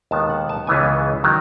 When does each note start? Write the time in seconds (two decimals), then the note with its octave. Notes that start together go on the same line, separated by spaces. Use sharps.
0.11 D#2 D#3 G#3 B3 A5
0.30 F#5
0.49 A5
0.67 C#2 C#3 E3 B3 G#5
1.24 D#3 F#3